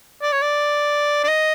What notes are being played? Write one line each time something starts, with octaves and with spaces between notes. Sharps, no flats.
D5
C#5
D5
D5
D#5